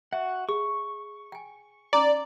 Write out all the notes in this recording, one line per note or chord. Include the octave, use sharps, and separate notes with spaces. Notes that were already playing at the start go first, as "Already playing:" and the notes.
F#4 E5 F#5
G#4 C#6
G5 G#5
C#4 D#4 D5 A#5